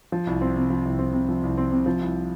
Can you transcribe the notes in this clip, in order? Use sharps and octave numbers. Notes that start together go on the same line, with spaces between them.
F3
C2
C4
C3
F3
C2
C4
C3
F3
C2
C4
C3
F3
C2